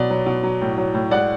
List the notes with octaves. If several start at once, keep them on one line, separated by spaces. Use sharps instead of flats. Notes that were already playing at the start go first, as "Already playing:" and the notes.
Already playing: B2 F#3 D5
F#3
B2
F#3
A2
F#3
A2
G#3 D5 F#5